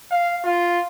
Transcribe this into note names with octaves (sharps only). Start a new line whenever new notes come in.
F5
F4